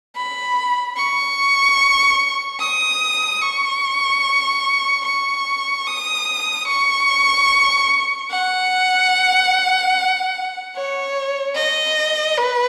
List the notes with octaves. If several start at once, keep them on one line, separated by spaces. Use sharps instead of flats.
B5
C#6
D#6
C#6
C#6
D#6
C#6
F#5
C#5
D#5
B4